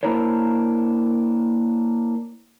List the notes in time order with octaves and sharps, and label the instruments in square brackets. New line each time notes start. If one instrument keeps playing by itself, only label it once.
[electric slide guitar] A#3 D4 E4 A#4 C5 C#5